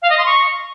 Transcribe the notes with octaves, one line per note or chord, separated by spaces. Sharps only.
F5
D#5
C6
C#6